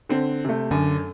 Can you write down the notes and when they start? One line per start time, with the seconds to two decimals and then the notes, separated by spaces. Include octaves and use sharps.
0.09 D3 C4
0.45 C3 A3
0.71 F#2 D3